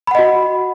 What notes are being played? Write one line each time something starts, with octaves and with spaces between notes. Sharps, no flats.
F#4 D#5 F#5 B5